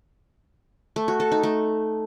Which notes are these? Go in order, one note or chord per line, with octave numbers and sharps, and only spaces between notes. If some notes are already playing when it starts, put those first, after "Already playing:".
A3
F#4
A4
D#4
A3